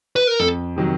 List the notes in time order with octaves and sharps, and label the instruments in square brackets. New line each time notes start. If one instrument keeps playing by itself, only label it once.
[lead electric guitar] B4
A#4
[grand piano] F2 [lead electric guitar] A4
[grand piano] C3 D#3 F#3